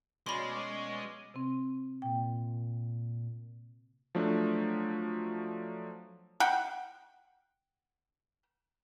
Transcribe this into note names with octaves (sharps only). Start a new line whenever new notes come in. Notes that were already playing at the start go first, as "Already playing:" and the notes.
B2 G#3 C#4 D5 B5 C6
C3 C4
A#2 G5
F3 F#3 A3 D4
F#5 G5